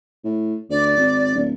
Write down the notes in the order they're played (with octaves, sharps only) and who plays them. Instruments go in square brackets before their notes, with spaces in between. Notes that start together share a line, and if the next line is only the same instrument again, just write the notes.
[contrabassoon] A2
[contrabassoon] D2 [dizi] D5
[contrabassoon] G#1
D1